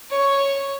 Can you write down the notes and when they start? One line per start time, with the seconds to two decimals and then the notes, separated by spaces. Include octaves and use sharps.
0.10 C#5